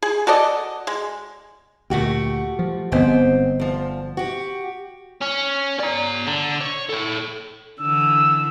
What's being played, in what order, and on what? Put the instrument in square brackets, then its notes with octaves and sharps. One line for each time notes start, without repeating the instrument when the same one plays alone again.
[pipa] G#4
F#4 A4 D5 D#5
G#3
[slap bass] D2 A#2 [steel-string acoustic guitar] A3 F#4 G4
[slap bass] F3
[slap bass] G1 B3 [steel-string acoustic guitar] G#2 C4
[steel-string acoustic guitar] D2 F3
F#4 G4
[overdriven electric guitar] C#4
D5 A#5
D3
C#5
A4 C#5
[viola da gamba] D3 E3 [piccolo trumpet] E6